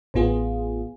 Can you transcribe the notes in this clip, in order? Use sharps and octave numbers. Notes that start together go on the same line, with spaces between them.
A1 A2 B3 F4 G#4